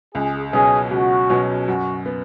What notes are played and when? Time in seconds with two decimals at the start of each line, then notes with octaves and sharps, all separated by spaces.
0.15 C#2 G#4
0.53 B2 F#3 C#4 G#4
0.91 C#2 F#4
1.30 B2 F#3 C#4
1.68 F#2 F#4
2.06 B3